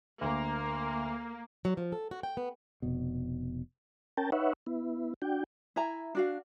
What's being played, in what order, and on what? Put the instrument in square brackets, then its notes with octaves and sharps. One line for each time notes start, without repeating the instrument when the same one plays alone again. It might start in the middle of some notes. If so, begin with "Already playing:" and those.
[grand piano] D2 [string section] A#3
[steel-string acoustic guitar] F#3
F3
A4
F#4
G5
B3
[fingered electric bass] F1 B2
[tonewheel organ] C#4 A#4 G5 A5
D#4 B4 C#5 E5 F#5
B3 E4
D4 F#4 G5
[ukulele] E4 E5 G#5 A#5
D4 F#4 F5